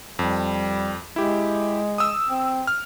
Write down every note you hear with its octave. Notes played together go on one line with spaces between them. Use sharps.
F2 G3
G#3 E4 G4
D#6 E6
C4
F6